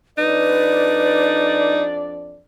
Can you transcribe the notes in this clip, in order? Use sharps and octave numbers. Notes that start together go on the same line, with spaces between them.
F2 D4 D#4 B4 D5